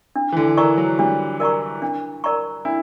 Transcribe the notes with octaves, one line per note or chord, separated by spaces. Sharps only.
D4
E3
D3
E3 A#4 D5 A#5 C#6
F#3
G3 D4
A#4 D5 A#5 C#6
D4
A#4 D5 A#5 C#6
D4 E4